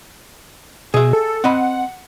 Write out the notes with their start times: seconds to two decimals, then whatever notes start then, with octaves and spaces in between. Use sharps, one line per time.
0.94 B2 G#4 E5
1.13 A4
1.44 C4 D#5 F#5 B5